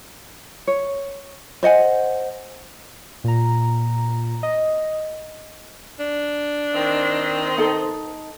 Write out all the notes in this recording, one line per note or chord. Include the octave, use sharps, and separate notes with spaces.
C#5
C5 D#5 F#5 G#5
A#2 A#5
D#5
D4
D#3 C4 D#5
D#4 A4